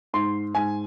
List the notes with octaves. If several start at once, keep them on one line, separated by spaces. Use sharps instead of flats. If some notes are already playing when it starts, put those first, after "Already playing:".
G#2 C6
G#2 G#5